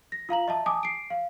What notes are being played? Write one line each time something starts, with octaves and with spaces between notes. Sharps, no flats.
A#6
F4 F5 A#5 F#7
D#5 E5 A5
G#5 A5 D6 D#6
C7 D7
F5